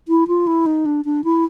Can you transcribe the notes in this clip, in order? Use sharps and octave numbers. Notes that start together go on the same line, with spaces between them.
E4
F4
E4
D#4
D4
D4
E4